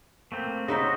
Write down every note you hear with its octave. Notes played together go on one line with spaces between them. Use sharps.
A3 A#3 C4
C#3 D#4 F#4 C5 D#5 E5